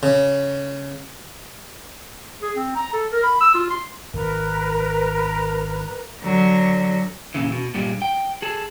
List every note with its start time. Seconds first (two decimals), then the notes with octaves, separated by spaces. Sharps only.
0.03 C#3
2.42 G#4
2.56 C4
2.76 A#5
2.93 A4
3.12 A#4
3.24 B5
3.41 E6
3.54 F4
3.70 C6
4.14 G#1 A#4 B4 A#5
6.22 D3 F#3
7.34 A#2 C#3 E3
7.52 B2
7.74 G2 A#2 G3 G#3
8.02 G5
8.42 G#4 A4